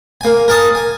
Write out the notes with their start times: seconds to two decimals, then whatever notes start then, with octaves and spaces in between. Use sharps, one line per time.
0.21 A#3 G#5
0.48 A#4 G#5 A5 D#6
0.75 G#5